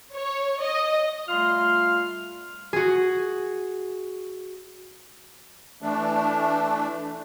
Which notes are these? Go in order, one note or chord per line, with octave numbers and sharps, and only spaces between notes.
C#5
D#5
G3 A3 F4 F5 C6 F6
F#4 G#4
E3 A3 D4